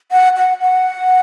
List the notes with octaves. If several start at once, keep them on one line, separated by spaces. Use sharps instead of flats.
F#5
F#5
F#5